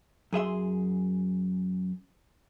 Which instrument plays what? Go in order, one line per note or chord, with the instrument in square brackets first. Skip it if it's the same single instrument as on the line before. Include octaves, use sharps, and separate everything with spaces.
[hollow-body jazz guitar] F#2 G#4 E5 C6